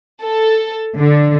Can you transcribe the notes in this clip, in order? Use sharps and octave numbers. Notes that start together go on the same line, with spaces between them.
A4
D3